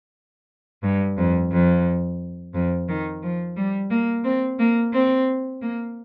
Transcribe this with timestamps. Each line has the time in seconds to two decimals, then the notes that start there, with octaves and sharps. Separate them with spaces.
0.83 G2
1.18 F2
1.52 F2
2.54 F2
2.88 D#3
3.23 F3
3.57 G3
3.91 A#3
4.24 C4
4.59 A#3
4.93 C4
5.62 A#3